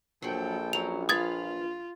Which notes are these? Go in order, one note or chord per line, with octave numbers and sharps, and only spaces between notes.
A#1 F3 F#3 A4 G5
F#3 C#4 F7
F4 B4 F5 D#6 G#6 A6